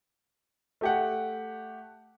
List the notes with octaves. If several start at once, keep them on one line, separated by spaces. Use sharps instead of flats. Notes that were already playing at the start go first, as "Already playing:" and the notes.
A3 G4 F#5